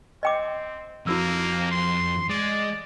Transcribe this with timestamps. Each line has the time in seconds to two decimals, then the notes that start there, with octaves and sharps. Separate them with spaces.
0.23 C4 D#5 G5 D6
1.07 F2 A#3 E4 F#4 E6
1.71 C6
2.29 G#3 D5